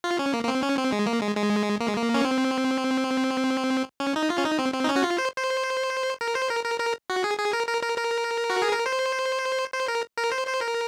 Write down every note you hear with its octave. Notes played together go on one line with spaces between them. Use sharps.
F4
C#4
A#3
A#3
C4
C#4
C4
G#3
A#3
G#3
G#3
A#3
G#3
A#3
C#4
C4
C#4
D#4
F4
C#4
D#4
C4
C4
D#4
C#4
F#4
F4
C5
C5
A#4
C5
A#4
A#4
A#4
F#4
G#4
G#4
A#4
A#4
A#4
A#4
F#4
G#4
A#4
C5
C5
A#4
A#4
C5
C5
A#4